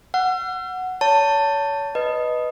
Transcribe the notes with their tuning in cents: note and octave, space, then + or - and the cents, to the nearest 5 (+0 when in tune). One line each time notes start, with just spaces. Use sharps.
F#5 +0 E6 +45
C#5 +30 A5 +15
B4 +0 D#5 +0